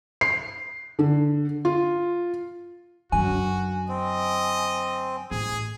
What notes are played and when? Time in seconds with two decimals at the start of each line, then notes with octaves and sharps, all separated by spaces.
0.21 C7
0.99 D3
1.65 F4
3.12 F#2 D3 F#4 G#5
3.88 C4 D#5
5.31 A1 G#4